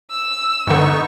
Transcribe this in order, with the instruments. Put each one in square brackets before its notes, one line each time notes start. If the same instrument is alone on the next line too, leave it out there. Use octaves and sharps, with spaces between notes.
[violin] E6
[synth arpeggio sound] G2 D3 [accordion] B3 D#4 C#6